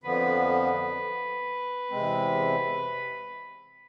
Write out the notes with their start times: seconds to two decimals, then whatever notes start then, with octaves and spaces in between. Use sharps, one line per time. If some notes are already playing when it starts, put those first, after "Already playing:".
0.04 F2 D3 F3 B3 B4
1.90 E2 C3 G#3 C4